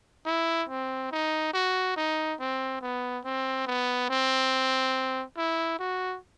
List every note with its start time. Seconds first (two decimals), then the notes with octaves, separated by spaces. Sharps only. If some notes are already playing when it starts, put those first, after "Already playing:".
0.26 E4
0.69 C4
1.11 D#4
1.53 F#4
1.96 D#4
2.39 C4
2.81 B3
3.24 C4
3.67 B3
4.09 C4
5.37 E4
5.79 F#4